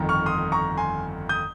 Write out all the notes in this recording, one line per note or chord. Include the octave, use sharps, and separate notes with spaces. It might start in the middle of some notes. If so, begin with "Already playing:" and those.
Already playing: G1 F2 D#3
C#6 F6
C6 D#6
A#5 C#6
G#5 C6
D#6 G6